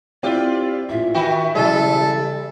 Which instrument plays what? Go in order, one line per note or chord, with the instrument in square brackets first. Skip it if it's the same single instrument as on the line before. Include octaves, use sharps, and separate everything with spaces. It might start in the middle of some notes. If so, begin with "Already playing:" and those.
[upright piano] C4 E4 [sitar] F4 G4 [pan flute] D5
[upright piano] A1 A#2 [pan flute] E5
[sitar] D#3 F#4 [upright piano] G5
[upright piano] C#3 E3 F#3 [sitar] G3 [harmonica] A4